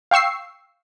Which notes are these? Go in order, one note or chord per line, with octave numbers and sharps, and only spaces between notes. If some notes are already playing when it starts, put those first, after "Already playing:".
F5 G5 C#6 E6 C7